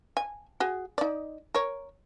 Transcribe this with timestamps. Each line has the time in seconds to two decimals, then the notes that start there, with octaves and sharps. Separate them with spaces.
0.17 G#5
0.60 F#4 G#4
0.98 D#4 D5
1.55 A#4 C#5